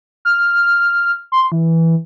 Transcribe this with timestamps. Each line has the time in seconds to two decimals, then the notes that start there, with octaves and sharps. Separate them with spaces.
0.25 F6
1.32 C6
1.52 E3